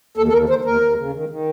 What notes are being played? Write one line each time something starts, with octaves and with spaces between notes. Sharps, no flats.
D#2 A4
A4
D#2 A#4
D#2 C5
D#2 A#4
D#2
C#3
D#3
D#3